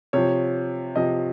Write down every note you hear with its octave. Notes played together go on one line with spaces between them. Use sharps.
C3 F3 C#5
C3 F3 D#5